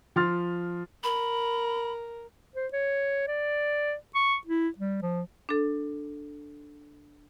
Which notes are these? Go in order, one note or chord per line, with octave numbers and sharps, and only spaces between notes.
F3 C6 F6 A6
A#4 B5
C5
C#5
D5
C#6
E4
G3
F3
D4 A4